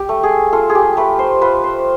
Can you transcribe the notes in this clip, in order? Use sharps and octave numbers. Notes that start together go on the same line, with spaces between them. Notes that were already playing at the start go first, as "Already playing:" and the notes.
Already playing: G4
A3
G#4
F4 A4
G#4
G4
A3 B4
C5
F4 B4
C5